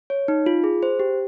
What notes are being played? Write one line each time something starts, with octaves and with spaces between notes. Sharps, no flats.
C#5
D#4
F4
G#4
C5
G4